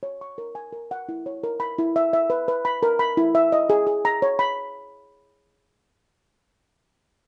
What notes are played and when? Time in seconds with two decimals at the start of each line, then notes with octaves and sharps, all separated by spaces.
0.03 C#5
0.21 C#6
0.38 A#4
0.55 G#5
0.73 A#4
0.91 F#5
1.09 E4
1.26 C#5
1.44 A#4
1.60 B5
1.78 E4
1.96 E5
2.13 E5
2.30 B4
2.48 B4
2.65 B5
2.83 A#4
2.99 B5
3.17 E4
3.35 E5
3.52 D#5
3.70 G#4
3.87 G#4
4.05 A#5
4.22 C#5
4.39 B5